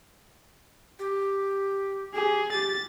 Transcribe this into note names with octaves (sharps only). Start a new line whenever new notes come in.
G4
G4 G#4
G4 A6